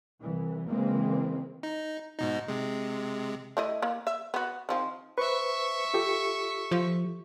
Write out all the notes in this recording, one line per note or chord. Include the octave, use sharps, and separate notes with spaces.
C2 E3
C#3 E3 G#3 A#3 C4
D#4
G#2 B2 D#4
C3 G#3
A3 E4 D#5
A#3
E5
B3 F#4
D#3 F3 C4
B4 C5 E5 C#6
F4 G4 A4
F3